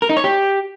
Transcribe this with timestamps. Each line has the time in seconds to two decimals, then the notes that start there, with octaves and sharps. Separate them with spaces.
0.02 A#4
0.09 D#4
0.17 C#5
0.24 G4